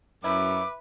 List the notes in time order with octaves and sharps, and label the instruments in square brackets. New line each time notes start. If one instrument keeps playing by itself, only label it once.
[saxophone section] F#2 [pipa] E4 [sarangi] B4 [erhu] D6